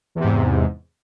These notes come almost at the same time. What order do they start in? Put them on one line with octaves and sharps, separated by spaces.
E2 C3 G#2